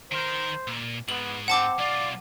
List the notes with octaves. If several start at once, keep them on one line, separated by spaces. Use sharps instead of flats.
D#3 A#4 C5
A#2
G#2 B3 F#7
C4 F#5 A5 D6
B1 F4 D5